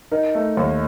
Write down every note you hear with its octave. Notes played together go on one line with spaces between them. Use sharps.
D#4 A#4
A3
D#2